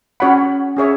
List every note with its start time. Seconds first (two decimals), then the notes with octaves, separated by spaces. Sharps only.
0.20 C#4 F#4 C#5 F#5 B5
0.76 C#4 G#4 C#5 E5